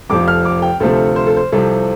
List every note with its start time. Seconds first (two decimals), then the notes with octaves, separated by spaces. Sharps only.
0.10 F1 F2 F3 D6
0.28 F6
0.45 D6
0.62 G5
0.80 D2 C3 F3 A3 A4
1.16 C5
1.27 A4
1.37 C5
1.52 C2 C3 F3 C4 A4